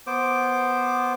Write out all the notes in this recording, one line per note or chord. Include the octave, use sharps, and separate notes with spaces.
B3 C5 D6